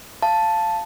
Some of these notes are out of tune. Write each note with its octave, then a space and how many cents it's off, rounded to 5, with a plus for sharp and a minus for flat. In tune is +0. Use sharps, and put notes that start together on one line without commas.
F5 -15 A5 +0